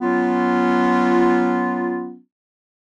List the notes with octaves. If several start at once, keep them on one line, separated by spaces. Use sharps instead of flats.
F#3 B3 C#4 F4